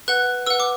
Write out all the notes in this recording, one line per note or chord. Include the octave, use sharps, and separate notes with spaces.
B4 F#5 F#6
B4 F#5 E6
D6